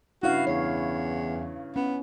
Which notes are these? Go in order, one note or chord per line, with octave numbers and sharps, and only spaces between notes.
G2 C#3 E4 F#4 F5
E2 C#5
B3 C#4